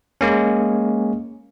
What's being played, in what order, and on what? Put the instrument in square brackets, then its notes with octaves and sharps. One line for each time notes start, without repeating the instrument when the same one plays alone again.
[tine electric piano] G#3 A#3 C#4